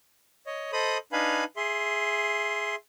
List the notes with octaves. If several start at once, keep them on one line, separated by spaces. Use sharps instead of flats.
C#5 D#5
A4 C5 D#5 B5 D#6
D4 D#4 B4 F5 G#5 B5
G#4 E5 C6